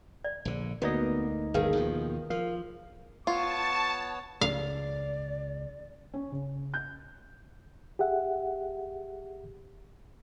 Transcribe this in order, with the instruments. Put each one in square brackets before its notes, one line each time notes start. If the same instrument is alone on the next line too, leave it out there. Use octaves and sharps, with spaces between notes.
[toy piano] D5
[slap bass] A#1 D3
[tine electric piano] D2 D#4 D#5 [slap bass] A#3 [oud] B3 [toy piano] F#4 D5
[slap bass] G1 [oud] D#3 G#4 [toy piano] A#4 B4 F5
[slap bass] D#2 B2 F3
[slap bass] F3 [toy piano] A#4 [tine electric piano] F5
[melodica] B3 C#5 [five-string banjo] F4 [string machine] A5 [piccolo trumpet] C#6
[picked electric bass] C#2 C#3 [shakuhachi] D5 [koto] F5
[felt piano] C#4
C#3
G6
[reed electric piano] G4 G#4 E5 F#5